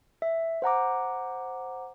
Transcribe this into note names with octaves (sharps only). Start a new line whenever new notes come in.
E5
C5 F#5 A#5 D6